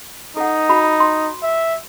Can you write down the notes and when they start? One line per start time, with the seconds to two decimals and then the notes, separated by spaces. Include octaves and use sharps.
0.37 D#4 A4 F#5
0.69 F#4 B5
1.00 C6
1.43 E5